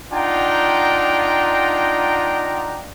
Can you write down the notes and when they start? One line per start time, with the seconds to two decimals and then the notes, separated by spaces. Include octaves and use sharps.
0.12 D4 D#4 F4 F#5 G5 A#5